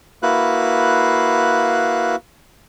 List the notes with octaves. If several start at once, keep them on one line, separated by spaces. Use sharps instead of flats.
A#3 E4 F#4 B4 F5 F#6